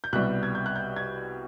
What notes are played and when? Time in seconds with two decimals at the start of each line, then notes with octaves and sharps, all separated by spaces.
0.04 G6
0.12 C2 B2 G3 F#6
0.43 G#6
0.55 G6
0.66 F#6
0.76 G6
0.96 G#6